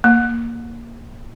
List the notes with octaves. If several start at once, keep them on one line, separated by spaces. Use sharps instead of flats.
A#3